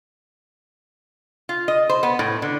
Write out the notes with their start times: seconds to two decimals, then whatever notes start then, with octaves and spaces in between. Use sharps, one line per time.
1.49 F4
1.68 D#5
1.89 C5
2.03 B3
2.19 A2
2.42 D3